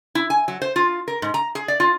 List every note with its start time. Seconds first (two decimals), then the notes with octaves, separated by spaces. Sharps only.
0.15 E4
0.30 G#5
0.48 F#3
0.62 C5
0.76 F4
1.08 A#4
1.22 G#2
1.34 A#5
1.55 G#4
1.68 D5
1.80 F4